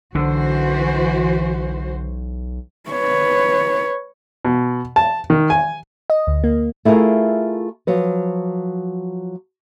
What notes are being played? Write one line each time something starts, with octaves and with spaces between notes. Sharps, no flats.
B1 D3 E3 F#4 C5
B4 C#5
B2
A5
D#3
G#5
D#5
D2
A#3
A3 E4 F4 G#4 A#4
F3 F#3 B4